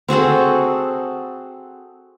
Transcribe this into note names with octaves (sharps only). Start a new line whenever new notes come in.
C4 F#4 G#4 A4